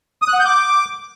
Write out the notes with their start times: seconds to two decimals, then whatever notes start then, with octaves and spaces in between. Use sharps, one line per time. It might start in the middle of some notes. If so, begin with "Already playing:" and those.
0.22 D#6
0.28 F#6
0.34 F#5
0.40 G6
0.46 D6